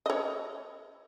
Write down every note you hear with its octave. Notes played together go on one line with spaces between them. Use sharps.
C#5 D#5